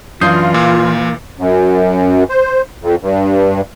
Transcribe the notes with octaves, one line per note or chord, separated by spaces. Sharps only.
F#2 E3 D4 F4 D#6 G6 C7
A#2 A#3
F#2
C5
F2
G2